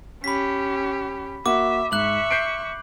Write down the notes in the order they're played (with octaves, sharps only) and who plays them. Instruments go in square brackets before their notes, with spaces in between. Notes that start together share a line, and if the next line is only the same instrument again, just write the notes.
[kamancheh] C#4 G4 [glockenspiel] B5 B6
[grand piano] A#3 F#4 [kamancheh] E5 [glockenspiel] D6
[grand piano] G#2 [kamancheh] E5 C#6 [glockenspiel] F#6 F#7
[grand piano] G6 C7 D7